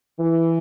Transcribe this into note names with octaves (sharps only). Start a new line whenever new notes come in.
E3